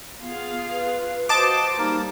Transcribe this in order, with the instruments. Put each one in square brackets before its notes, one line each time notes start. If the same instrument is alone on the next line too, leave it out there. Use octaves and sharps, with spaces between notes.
[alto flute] B3 [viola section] F4 G#4 F5
[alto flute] B4
[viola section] F#4 C5 [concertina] D#5 [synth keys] A5 D6
[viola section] G3 [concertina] A#3 A#4 [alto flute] D#4